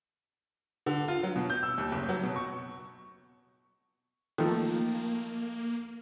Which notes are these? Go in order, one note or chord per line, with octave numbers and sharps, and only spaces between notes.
D3
F4
F#3
B2
G6
E6
D#2
F#1
F#3
B2
C#6
D#3 F3 A3 A#3